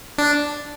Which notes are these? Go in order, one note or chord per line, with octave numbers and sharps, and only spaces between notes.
D4